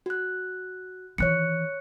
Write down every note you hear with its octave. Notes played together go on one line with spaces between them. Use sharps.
F#4 F#6
D#3 E3 C#5 F#6 C#7